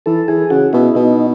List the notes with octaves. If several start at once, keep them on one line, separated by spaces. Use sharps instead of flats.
E3 A4
E3 G#4
C#3 F#4
B2 E4
B2 D#4